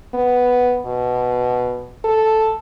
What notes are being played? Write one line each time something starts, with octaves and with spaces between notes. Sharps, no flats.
B3
B2
A4